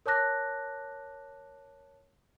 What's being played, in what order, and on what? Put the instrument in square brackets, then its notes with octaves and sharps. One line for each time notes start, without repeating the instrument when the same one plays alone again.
[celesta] A#4 C#5 A5 D6 F#6 A#6